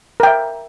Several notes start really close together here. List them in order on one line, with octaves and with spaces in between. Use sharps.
A#4 G5 E5